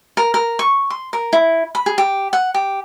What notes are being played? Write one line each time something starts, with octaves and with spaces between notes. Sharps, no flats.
A#4
A#4
C#6
C6
A#4
E4
B5
G#4
G4
F#5
G4